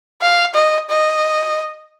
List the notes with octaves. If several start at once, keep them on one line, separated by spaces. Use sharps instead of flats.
F5
D#5
D#5